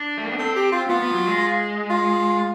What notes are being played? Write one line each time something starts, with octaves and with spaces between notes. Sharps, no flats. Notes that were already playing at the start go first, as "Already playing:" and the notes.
Already playing: D4
A3
A#3
B3
C4 A4
G4
F4
B3 F4
B3
F#3
G#3
F4